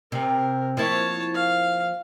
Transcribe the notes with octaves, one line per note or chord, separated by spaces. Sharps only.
C3 A#4
F3 A#3 E4 C#5 A5
F5